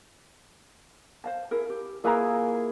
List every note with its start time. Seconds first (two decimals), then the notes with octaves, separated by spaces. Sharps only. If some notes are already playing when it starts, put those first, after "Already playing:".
1.24 C5 F5 A5
1.51 E4 G#4 A#4
1.70 G4
2.04 A#3 E4 F4 G#4 B4 A#5